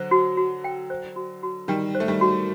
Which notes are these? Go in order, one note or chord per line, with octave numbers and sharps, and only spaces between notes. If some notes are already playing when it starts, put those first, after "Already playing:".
Already playing: D3 F#3 C5
F#4
F#4
G5
C5
F#4
F#4
D#3 G3 G5
C5
A3
D#3 G3
F#4